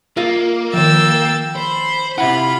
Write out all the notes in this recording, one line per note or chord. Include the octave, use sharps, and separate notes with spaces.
A#3 F4 D#5 F5
D#3 F3 G5 E6 A6
C5 B5
C3 E4 F4 F#5 B5